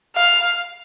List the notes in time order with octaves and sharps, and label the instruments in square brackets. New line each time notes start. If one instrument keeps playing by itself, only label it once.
[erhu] F5